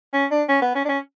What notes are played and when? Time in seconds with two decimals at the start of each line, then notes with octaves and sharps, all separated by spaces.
0.13 C#4
0.31 D4
0.49 C#4
0.62 B3
0.75 C#4
0.85 D4
0.89 C#4